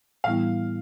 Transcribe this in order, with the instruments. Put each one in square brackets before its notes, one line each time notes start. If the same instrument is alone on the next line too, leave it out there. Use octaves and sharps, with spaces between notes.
[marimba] A2 E3 G3 B3 E4 [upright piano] F5